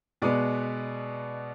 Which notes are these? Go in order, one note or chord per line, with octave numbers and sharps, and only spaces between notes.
B2 G#3 B3 D5